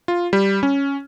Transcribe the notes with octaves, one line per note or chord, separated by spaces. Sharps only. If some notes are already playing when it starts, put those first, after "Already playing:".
F4
G3
C#4